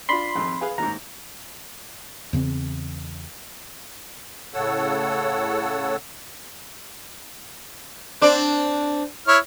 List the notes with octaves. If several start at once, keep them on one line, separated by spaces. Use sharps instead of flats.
D4 F4 B5 C6
G#1 F2
G#4 B4 F5
D#2 G#2 A#5
E2 C#3 C4
A2 C#3 A4 C#5 F#5 E6
C4 D4 D5
E4 C#5 F6